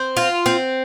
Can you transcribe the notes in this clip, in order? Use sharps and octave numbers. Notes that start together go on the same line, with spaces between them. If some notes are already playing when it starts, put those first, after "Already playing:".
Already playing: C4
F4
C4